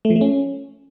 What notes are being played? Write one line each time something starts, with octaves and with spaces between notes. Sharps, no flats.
A3
F3
A3
C#4